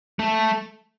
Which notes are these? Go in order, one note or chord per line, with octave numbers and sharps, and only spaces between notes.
A3